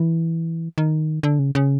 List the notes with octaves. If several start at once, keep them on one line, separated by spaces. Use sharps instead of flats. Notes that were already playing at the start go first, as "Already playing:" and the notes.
Already playing: E3
D#3
D3
C#3
C#3